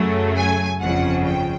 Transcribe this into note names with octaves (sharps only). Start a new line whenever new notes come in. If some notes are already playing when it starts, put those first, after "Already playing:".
Already playing: F#2 C#3 F#3 A3
G#5
G1 F2 C#3 F3 F#5
G5